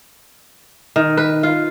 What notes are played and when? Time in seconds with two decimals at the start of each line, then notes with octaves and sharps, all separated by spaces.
0.96 D#3
1.17 B4
1.43 F4